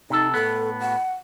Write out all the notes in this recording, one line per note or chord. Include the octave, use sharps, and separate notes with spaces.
C3 D#4 A4
A2 B3 A4
F#5